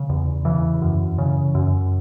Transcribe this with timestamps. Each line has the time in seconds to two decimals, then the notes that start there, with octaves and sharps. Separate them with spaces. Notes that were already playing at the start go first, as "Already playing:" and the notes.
Already playing: C#3
0.09 E2
0.45 C#3 E3
0.82 F#2
1.18 C#3
1.55 F#2